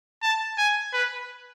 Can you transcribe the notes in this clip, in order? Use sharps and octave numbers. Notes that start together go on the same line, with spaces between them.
A5
G#5
B4